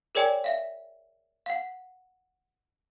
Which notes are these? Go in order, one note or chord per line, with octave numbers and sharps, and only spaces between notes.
G#4 A#4 C#5 D5 G5 G#5
E5 F5
F5 F#5